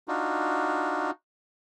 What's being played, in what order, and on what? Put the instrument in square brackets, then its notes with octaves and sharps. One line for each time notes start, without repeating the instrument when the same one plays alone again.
[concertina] D4 D#4 F4 F#4